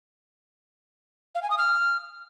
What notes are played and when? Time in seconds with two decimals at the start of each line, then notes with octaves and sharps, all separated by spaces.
1.35 F5
1.43 G#5
1.50 D#6
1.58 F6